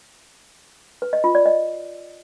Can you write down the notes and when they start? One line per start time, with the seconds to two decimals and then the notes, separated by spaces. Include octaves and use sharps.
1.02 B4
1.13 D#5
1.24 F4
1.35 D5
1.46 D#5